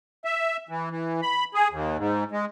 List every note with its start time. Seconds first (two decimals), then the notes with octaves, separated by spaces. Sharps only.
0.25 E5
0.69 E3
0.91 E3
1.22 B5
1.54 G#4
1.71 D#2
1.97 G#2
2.32 G#3